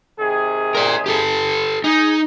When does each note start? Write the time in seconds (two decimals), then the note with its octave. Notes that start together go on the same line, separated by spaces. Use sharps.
0.20 C3 D#3 G#4
0.75 A#4 D5
1.06 G4 A4
1.84 D#4 G#4